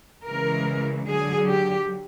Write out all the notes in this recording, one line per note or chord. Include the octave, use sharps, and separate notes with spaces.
C#3 E3 G#3 A#4
D3 F#3 G#4
G4